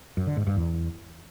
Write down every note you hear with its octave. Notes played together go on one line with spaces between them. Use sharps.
F#2
D3
G#2
G2
E2